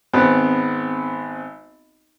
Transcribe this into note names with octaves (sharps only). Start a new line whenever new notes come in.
G#1 B3 C4